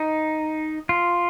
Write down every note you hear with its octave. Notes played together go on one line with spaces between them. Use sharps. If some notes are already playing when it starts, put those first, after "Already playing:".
Already playing: D#4
F4